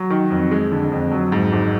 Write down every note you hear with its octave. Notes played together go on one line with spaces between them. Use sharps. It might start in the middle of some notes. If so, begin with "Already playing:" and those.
Already playing: F#3
D#3
F2
G#3
D3
F2
F#3
G#2
G#1